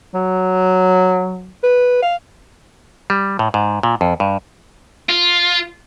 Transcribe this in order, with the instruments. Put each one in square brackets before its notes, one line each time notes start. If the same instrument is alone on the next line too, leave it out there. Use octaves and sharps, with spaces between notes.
[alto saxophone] F#3
B4
F5
[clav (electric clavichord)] G3
A2
G#2
A#2
F2
G2
[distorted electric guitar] F4